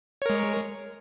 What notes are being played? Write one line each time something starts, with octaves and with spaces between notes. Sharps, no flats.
G#3 A#4 C#5